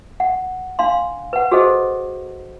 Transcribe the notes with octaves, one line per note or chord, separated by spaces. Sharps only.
F#5
D4 F5 C6
B4 F#5
F#4 G#4 A4 C5 D#5